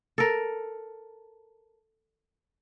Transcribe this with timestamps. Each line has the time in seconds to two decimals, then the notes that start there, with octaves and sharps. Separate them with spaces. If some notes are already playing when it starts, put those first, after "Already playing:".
0.18 A4 A#4